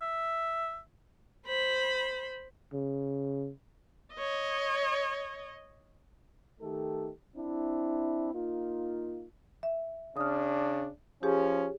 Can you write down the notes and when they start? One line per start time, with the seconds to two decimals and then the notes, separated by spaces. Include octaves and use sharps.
0.02 E5
1.47 C5 B5
2.74 C#3
4.14 C#5 D#5
6.61 D#3 A3 D#4 G4 A4
7.35 C4 D4 E4
8.33 A#3 D#4 F4
9.63 E5
10.17 C#3 D4 D#6 F6
11.23 F3 C#4 G4 G#4 C#5